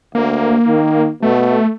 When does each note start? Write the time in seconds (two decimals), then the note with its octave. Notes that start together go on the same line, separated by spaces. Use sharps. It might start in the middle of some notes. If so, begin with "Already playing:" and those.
0.15 D2 A#3
0.67 D#3
1.23 B2 A3